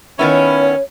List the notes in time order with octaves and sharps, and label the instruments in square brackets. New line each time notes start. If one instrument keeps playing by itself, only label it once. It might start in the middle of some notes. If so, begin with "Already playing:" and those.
[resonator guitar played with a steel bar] D#3 B3 E4 [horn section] C#4 [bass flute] C#5